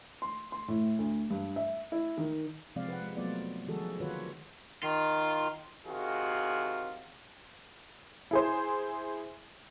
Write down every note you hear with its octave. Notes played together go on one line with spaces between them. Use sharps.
C6
C6
A2
D2
G2
E5
E4
D#3
C3 F3 G#3 C4 D5 F5
B4 F#5
G#3
F#3 A3 B3 F4 D5
D#3 F3 G#3 F#4 G#4 A4
D3 D#3 F4 F#4 B4 C#5
D#3 F4
C3 D#3 F4 F#4 G#4
E4 G#4 C5